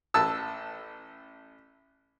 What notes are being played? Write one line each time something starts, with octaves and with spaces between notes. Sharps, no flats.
A1 A5 E6